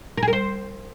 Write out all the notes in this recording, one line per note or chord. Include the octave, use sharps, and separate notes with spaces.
A#4
G#4
A#4
C5